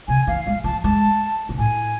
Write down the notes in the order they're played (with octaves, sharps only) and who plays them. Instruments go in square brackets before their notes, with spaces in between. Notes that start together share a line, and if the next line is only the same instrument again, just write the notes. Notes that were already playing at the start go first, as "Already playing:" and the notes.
[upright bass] C3 [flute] G#5
[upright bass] E3 [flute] F5
[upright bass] G#3 [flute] F5
[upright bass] F3 [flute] A5
[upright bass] G#3 [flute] A5
[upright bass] G#2
[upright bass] A2 [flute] G#5